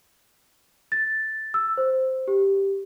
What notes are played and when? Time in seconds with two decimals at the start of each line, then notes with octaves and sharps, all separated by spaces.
0.92 A6
1.54 E6
1.77 C5
2.28 G4